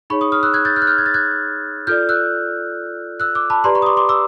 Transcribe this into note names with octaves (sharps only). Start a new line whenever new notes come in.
D#4 G#4 C#5 B5 C#6
C#6 D#6
D#6 F6
E6 F#6
F#6 G#6
G6 A6
F6 G6
F#6
F6 G6
G#6
A6
F#6 G#6
F4 A4 D5 F6 G6
E6 F#6
E6 F#6
D6 E6
A5 B5
G4 B4 D5 A#5 C6
B5 C#6
D#6
C6 D6
C6 D6
D6 E6